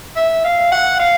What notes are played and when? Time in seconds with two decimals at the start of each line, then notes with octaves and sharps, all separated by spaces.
0.17 E5
0.44 F5
0.72 F#5
1.00 F5